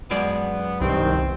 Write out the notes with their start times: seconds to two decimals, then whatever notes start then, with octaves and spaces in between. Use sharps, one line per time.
0.11 F#2 G#3 B3 D5
0.81 C2 G2 B2 D#3 C4